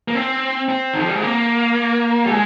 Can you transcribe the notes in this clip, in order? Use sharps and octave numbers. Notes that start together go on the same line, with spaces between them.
A#3
C4
C4
D#3
F3
G3
G#3
A#3
G3
G#3